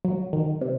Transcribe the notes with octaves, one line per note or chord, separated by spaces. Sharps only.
F#3
D#3
C3